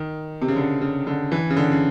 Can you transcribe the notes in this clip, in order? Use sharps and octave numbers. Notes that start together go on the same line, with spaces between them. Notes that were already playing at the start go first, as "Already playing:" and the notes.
Already playing: D#3
C3
C#3
D3
C#3
D3
E3
C#3
D3
C#3